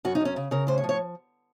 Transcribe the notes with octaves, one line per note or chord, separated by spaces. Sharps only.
F#2 F#4
D#4
F#2 C#4
C#3
C#3 A#4
A2 C5
C#5
F3
C#5